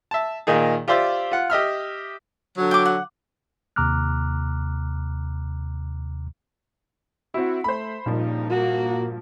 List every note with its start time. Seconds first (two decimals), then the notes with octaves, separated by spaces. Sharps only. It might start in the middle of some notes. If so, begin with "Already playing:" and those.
0.11 E5 A5
0.47 A#2 D#3 D#4 F4 G#4
0.88 F4 G4 C5 D5 E5
1.32 F4 F#5
1.50 G4 D#5 E5 F6
2.57 D3 F#3
2.71 G5 D6
2.86 F#5
3.76 D#2 C3 A#5 D6 F6 F#6
7.34 C4 E4 F#4
7.64 A3 C5 B5
8.06 G2 A#2 C#3 F3 G3 D#4
8.50 A#3 F#4